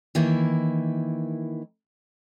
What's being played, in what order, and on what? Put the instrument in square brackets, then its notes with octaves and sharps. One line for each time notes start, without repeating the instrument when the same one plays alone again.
[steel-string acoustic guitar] D#3 E3 A#3 E4